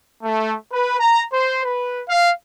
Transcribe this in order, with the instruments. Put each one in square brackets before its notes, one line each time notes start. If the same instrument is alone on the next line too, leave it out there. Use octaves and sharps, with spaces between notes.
[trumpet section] A3
B4
A#5
C5
B4
F5